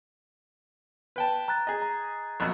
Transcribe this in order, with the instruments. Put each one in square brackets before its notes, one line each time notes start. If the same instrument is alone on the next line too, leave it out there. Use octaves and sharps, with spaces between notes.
[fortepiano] B4 G5 A5
[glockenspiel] A#5 F#6 A6
[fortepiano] G#4 D#5
[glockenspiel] A#5
[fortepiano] A#1 B2 F#3